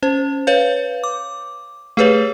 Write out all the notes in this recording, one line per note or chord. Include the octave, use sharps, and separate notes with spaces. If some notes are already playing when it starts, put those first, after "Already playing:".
C#4 C5
B4 C#5 F5 G6
D6
A3 G4 G#4 B4 C#5